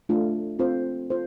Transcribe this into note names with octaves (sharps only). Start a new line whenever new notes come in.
A3 D4 F4 A4
C4 F4 A4 C5
F4 A4 C5